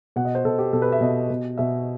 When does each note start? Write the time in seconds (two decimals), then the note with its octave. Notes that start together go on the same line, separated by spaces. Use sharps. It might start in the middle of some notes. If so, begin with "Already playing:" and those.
0.16 B2 F#5
0.25 D#5
0.35 C5
0.45 B2 A4
0.58 G4
0.73 B2 A4
0.82 B4
0.92 E5
1.01 B2 D#5
1.30 B2
1.58 B2 E5